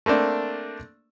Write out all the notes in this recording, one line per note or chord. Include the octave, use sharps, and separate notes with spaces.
A3 A#3 C4 D4